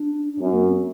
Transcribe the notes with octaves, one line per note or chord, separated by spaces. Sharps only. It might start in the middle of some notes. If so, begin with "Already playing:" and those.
Already playing: D4
D4
F#2 C4
A#3
C4